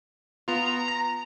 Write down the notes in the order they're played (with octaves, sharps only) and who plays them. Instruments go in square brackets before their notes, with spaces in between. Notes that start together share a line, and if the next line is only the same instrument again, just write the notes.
[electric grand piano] B3 F4 [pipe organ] A#5
[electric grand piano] A#6